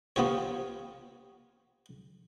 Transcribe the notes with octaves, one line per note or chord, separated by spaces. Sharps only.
A#3 B3 F4 G4 C#5